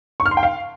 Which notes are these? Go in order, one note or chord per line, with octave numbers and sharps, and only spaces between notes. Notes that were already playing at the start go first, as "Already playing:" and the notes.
C#6
F6
C6
G5
F5